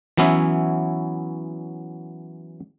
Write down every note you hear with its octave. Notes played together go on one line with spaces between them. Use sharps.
E3 F#3 B3 C#4 E4 E5